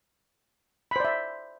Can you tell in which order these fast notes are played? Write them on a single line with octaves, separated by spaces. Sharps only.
B5 C5 D5 E5